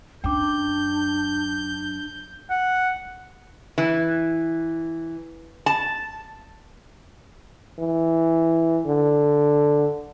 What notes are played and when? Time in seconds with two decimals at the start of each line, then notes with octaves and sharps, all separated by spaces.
0.24 F#2 D4 G5 D6 G6
2.50 F#5
3.78 E3
5.66 A5
7.79 E3
8.86 D3